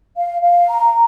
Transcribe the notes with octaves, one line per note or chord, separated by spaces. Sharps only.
F5
F5
A#5